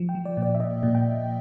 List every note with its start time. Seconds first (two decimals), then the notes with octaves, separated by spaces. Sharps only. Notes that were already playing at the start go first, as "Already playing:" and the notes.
Already playing: F3
0.09 G5
0.15 F3
0.25 D5
0.37 A#2
0.42 D5
0.55 E5
0.60 A#2 D#5
0.83 A#2
0.95 G5